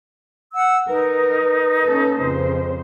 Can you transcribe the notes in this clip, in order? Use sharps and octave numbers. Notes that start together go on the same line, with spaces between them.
F#5 E6
D#4 A#4 B4
A#3 C#4 A4
F2 C#3 C5